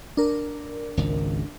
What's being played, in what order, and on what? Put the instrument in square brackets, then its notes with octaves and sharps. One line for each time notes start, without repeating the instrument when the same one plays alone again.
[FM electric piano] D4 A#4
[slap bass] G#1 C#2